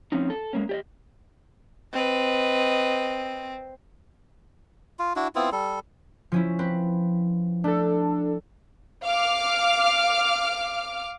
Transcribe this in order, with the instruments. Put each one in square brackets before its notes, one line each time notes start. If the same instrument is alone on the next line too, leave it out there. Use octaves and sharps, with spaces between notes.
[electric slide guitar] F3 C4 C#4 D#4
A4
G#3 A#3 C#4
G4 D5 D#5
[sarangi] C4 [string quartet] B4 D#5
[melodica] F4
D4 E4 F#4
B3 C4 E4 F4
G3 A4
[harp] F3 C#4 E4
C4 B4
[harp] A3 [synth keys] D4 A4
[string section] F5 D6 F6